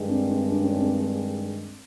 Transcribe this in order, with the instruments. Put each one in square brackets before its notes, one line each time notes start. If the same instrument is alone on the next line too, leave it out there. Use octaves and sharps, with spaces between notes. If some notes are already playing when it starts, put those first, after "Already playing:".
Already playing: [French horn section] G2 D#3 G#3
[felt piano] C4 D4
C4 D4
D4
C#4
C4 D4